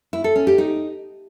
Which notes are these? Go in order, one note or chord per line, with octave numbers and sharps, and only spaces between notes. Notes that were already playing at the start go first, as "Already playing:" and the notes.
E4
A4
C#4
G4
D#4